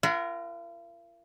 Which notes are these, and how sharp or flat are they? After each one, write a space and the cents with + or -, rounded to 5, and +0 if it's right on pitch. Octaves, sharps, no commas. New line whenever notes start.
F4 -45 A#4 +0 F#5 +0